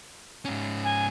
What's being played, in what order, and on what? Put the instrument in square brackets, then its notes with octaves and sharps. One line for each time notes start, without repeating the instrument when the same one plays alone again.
[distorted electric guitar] G#2 C#4
[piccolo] G#5